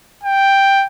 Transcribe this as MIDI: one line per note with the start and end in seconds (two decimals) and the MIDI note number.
0.23 0.86 79